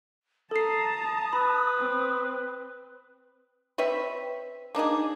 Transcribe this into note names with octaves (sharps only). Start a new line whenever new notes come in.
A4 A5 A#5 D#6 C7
B4 B5
C4
C4 B4 C#5 E5
A#3 D4 D#4 G#4